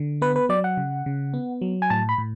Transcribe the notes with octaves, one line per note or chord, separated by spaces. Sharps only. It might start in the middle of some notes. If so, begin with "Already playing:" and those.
Already playing: D3
B3 B4
B4
F#3 D5
F#5
C#3
C#3
B3
F#3
G#5
A2 A5
B5
A2